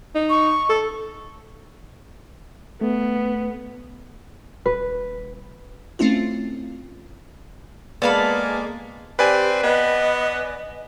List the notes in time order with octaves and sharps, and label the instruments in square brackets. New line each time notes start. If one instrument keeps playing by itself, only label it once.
[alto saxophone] D#4
[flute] C#6
[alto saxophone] A4
[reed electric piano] A3 [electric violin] B3
[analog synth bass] D#1 [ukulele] B4
[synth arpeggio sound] A3 C4 C#4 E4 F4
[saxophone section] G#3 A#3 [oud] B3 [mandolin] A4 F5 B5 [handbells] D5
[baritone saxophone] C4 [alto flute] G4 [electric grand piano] B4 D5 G#5
[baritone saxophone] B3 [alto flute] D#5